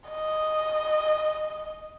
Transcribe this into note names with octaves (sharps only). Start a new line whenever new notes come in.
D#5